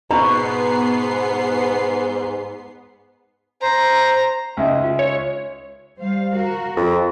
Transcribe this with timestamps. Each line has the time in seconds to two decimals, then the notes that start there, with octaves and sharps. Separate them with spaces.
0.11 G#2 B2 B3 A#5 C7
3.62 C5 A#5
4.57 C#2 D#4 D#5 E5 G#5
4.84 F4 G#5
4.99 C#5
6.00 G3 C5 F5
6.35 F#4 A#4
6.77 F2